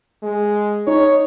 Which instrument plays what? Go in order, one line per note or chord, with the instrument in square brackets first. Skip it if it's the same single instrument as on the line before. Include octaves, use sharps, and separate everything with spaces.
[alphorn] G#3
[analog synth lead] D#4 [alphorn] C#5